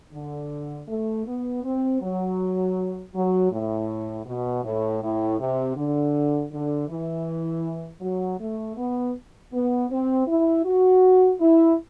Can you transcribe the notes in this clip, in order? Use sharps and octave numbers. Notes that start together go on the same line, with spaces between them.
D3
A3
B3
C4
F#3
F#3
A2
B2
A2
A2
C3
D3
D3
E3
F#3
A3
B3
B3
C4
E4
F#4
E4